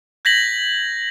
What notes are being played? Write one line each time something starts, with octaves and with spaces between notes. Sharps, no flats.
G6 G#6 A#6 B6 F#7